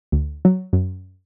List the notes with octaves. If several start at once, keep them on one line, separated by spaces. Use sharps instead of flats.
D2
F#3
F#2